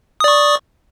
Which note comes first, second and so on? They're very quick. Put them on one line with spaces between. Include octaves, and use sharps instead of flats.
D#6 D5 C#6